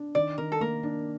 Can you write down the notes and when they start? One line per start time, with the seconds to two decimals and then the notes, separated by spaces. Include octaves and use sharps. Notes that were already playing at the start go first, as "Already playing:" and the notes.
Already playing: D4
0.15 D#3 D5
0.38 D#3 A#4
0.52 A4
0.61 A#3 A#4
0.83 D4